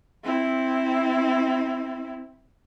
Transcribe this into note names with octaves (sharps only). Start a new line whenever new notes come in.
C4 E4